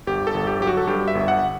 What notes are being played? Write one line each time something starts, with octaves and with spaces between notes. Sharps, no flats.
G1 G4
A4
G1
G4
F#3 G4
F#4
A4
G2 G4
E5
G1
F#5